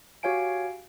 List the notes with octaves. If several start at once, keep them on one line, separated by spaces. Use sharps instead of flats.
F#4 G4 C#5 F5 G#5 D7